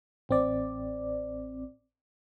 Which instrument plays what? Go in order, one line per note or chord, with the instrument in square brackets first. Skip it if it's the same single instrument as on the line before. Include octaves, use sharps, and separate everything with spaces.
[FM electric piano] A1 C4 D5